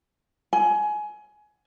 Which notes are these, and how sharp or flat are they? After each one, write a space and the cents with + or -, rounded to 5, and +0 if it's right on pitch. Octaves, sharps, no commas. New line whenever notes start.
G#5 +20